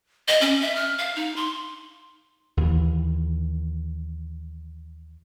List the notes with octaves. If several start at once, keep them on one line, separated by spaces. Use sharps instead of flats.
D#5
C#4
E5
F6
F5
D#4
C6
D#2 E3